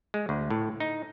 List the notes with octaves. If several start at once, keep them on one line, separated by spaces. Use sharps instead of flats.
G#3
D2
A2
D#4